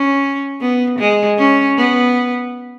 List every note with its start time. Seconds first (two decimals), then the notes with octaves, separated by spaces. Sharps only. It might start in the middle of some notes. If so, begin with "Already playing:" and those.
Already playing: C#4
0.61 B3
0.99 G#3
1.38 C#4
1.77 B3